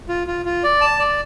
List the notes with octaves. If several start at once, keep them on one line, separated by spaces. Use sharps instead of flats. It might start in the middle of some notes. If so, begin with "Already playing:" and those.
F4
F4
F4
D5
A5
D5